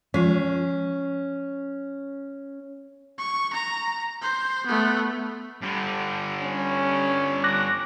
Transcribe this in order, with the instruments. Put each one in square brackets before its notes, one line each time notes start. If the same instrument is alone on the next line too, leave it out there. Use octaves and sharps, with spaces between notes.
[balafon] F3 G#3 F4 [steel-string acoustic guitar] C#4
[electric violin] C#6
A#5
C5
A3 B3
[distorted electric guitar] G2 D3
[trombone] C#4
[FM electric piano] D6 F#6 A#6